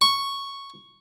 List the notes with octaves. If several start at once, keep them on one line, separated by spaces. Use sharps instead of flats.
C#6